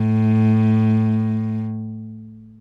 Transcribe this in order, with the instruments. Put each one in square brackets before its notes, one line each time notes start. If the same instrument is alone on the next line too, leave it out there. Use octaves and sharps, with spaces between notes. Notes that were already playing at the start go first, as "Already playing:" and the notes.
Already playing: [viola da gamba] A2